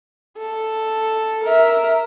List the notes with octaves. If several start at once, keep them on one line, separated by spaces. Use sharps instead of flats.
A4
A#4 E5